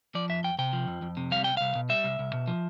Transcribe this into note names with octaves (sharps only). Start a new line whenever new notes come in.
F3 D5
F2 E5
F2 G5
C3 G5
F3
F2
F2
C3
G3 F5
C2 G5
C2 F5
B2
G3 E5
C2
C2
B2
F3